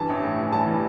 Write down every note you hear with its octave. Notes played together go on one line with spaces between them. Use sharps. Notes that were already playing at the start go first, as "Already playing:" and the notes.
Already playing: G2 E3 A5
A1
A2
E3
G3 A5
E3